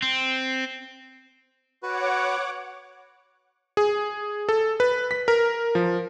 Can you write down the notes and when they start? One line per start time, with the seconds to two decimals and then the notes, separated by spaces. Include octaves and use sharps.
0.02 C4
1.83 F#4 B4 C#5 F#5 D6
3.77 G#4
4.49 A4
4.80 B4
5.11 B6
5.28 A#4
5.75 F3